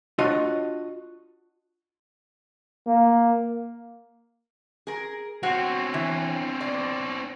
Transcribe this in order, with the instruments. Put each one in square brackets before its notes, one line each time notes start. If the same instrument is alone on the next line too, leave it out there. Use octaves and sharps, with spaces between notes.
[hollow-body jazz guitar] D4 F4 F#4 C#5 D#5
[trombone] A#3
[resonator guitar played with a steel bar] G#4 A#4
[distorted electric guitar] C4 C#4 [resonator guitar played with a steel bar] F#4
[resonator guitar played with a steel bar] E3
D5